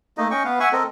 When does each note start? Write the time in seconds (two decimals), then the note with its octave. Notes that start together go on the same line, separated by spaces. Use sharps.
0.18 A3 A#3 D#4 D#5
0.31 C#4 D#5 G5 C#6
0.45 B3 B4 F5
0.60 E5 F#5 G#5 C#6
0.73 C4 A4 A#4 D#5